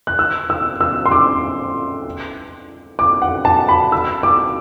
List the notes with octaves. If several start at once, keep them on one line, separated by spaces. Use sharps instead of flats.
F#6
E6
E6
E6
C6
D6
D6
F#5
A5
B5
E6
D6